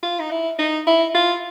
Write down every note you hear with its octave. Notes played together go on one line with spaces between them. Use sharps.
F4
D#4
E4
D#4
E4
F4